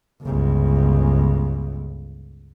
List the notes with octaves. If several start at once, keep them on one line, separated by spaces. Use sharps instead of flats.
G1 C#2